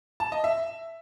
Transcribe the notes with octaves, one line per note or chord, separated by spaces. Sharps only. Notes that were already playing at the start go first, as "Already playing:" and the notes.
A5
D#5
E5